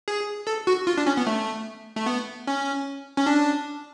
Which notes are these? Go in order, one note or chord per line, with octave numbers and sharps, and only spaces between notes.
G#4
A4
F#4
F4
D4
C#4
B3
A3
A3
B3
C#4
C#4
D4